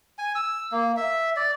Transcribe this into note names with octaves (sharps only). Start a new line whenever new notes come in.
G#5
E6
A#3
E5
D5